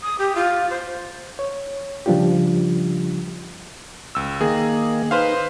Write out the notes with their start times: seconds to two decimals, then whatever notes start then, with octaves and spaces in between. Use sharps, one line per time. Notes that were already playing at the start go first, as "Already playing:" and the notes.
0.02 D#6
0.18 G4
0.35 F4
0.70 C5
1.39 C#5
2.06 C#3 F3 G3 D4 F4 G4
4.15 C#2 E6
4.41 D#3 A#3 G#4
5.11 D#4 B4 C5 F5